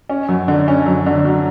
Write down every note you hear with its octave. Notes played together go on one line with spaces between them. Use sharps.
C#4
F#2
D3
C#4
F#2
D3
F#3